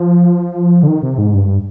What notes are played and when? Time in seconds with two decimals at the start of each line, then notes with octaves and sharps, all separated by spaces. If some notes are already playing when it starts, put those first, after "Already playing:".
Already playing: F3
0.83 D3
0.88 D#3
1.03 C3
1.18 G#2
1.34 G2